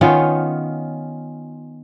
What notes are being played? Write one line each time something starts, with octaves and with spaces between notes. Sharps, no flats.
D#3 B3 C#4 F4